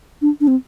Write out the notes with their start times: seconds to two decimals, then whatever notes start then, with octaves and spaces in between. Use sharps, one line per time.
0.22 D4
0.41 D4
0.48 C4